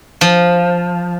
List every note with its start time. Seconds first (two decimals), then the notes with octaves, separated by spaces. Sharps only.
0.21 F3